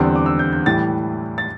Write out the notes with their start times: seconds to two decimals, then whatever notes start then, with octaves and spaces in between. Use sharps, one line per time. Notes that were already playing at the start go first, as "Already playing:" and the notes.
Already playing: E2 D3 G3 C4 E6
0.16 D6
0.26 E6
0.39 G6
0.53 G6
0.66 A2 E3 G3 A6
1.38 A6